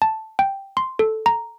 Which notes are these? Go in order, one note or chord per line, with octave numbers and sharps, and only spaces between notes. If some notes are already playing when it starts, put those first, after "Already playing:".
A5
G5
C6
A4
A#5